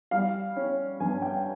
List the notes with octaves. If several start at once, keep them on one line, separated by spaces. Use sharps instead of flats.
G3 F5
C#4
G2 G#5
G5